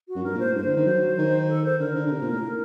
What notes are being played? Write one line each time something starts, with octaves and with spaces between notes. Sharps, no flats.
F#4
F#2
G2 A#4
A#2
C5
A2
G2 C5
D3
D#3
F#3
D#3
A4
C5
D3 A#4
D3
D3
C3
A#2
A2